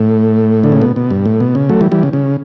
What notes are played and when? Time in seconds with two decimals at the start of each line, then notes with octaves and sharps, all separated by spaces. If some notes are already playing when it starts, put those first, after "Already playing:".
Already playing: A2
0.64 D3
0.72 C#3
0.82 B2
0.96 B2
1.10 G2
1.26 A2
1.40 B2
1.55 C#3
1.69 F#3 A3
1.81 E3 G3
1.92 E3 G3
2.03 C#3
2.13 C#3